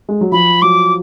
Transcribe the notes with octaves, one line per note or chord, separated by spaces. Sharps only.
G#3
F#3
F3 B5
F#3 D6